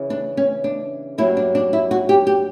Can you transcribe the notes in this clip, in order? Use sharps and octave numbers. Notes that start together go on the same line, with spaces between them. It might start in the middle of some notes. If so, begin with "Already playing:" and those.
Already playing: C#3 E3
D4
C#4
D4
G2 F#3 A#3 C#4 E4
D4
D4
E4
F#4
G4
G4